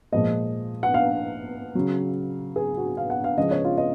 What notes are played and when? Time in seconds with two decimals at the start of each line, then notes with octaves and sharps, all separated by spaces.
0.12 A#2 F3 G#3 D#5
0.83 F#5
0.94 F5
1.75 C#3 F#3
2.56 G#4
2.77 F#4
2.97 F5
3.10 F#5
3.24 F5
3.38 C#3 F3 G#3 D#5
3.51 C#5
3.65 F4
3.78 D#5